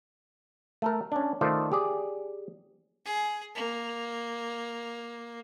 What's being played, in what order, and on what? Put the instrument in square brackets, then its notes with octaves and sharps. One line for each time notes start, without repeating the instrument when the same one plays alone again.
[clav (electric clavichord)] A3 A4 A#4
C#4 D4
D#3 A3 F4 A4 C5 D5
G4 G#4 D5
[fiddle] G#4
A#3